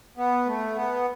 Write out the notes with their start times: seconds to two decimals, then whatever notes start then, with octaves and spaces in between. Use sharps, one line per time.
0.17 B3
0.47 A3
0.76 B3